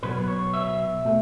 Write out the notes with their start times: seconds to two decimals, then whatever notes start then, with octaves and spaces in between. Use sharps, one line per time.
0.03 B2 F#3 B3 B4
0.28 C#5
0.53 E5
1.05 B2 A3